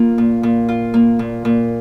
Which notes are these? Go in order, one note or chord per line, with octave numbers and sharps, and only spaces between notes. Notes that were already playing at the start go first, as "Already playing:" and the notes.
Already playing: A#3 F4
A#2
A#2
F4
A#3
A#2
A#2